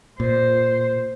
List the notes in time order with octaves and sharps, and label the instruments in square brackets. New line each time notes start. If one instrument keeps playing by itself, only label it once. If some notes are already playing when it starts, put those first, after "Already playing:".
[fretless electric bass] A#2 [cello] C5